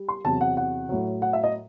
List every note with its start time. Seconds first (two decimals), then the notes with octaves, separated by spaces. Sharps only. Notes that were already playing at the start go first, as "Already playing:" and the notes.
Already playing: G3
0.09 C6
0.25 E2 C3 F#3 A5
0.41 F#5
0.57 F#5
0.89 A2 F#3
1.22 F#5
1.33 E5
1.44 D#5